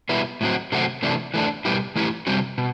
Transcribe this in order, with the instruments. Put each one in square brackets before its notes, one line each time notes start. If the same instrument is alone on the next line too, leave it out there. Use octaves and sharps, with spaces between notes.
[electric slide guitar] B2 G3 B3 E4
A2 F#3 C4 F#4
C3 F#3 A3 C4 F#4
C3 E3 A3 D4
E3 A3 D4
B2 G3 B3 E4 G4
E3 A3 E4 G4
C3 G3 C4 F#4
B2